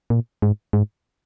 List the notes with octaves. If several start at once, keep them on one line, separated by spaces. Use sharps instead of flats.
A#2
G#2
G#2